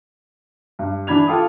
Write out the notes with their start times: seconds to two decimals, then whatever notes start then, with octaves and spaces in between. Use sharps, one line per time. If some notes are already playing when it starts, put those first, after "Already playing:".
0.79 G2
1.07 E3 D4 B5 G#6 F7
1.27 F4 A4 F5 G5 D6 D#6